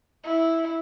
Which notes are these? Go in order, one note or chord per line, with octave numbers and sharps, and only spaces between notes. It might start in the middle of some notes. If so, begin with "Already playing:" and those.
E4